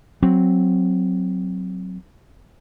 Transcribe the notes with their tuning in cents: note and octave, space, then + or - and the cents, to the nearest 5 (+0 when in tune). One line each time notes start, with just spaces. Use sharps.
F#3 +0 C4 +0